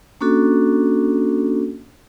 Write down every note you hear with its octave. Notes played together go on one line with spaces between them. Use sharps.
A#3 C#4 D4 F#4 A4